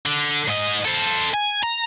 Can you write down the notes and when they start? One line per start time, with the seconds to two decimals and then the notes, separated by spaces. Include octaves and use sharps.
0.06 D3
0.48 G#2 D#5
0.85 A4 C5
1.34 G#5
1.63 A#5